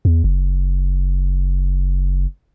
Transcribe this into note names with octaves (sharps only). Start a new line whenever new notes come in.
E2
F#1